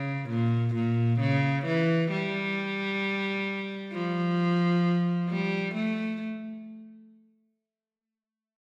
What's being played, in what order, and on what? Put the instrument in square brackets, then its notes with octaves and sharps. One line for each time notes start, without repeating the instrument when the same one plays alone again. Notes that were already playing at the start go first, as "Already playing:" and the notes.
Already playing: [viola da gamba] C#3
A#2
A#2
C#3
E3
G3
F3
G3
A3